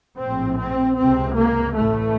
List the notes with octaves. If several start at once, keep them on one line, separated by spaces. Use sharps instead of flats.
A#1 A2 C4
C4
C#2 C3 C4
A#3
A1 A2 A3